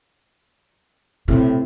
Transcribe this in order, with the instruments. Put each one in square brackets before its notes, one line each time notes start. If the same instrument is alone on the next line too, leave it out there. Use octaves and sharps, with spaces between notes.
[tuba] A2 [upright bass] C3